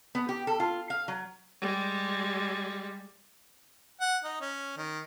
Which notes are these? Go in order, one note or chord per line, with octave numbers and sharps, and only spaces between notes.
B3
G4
A4
F4
F5
F#3
G3 G#3
F#5
D#4
C#4
D#3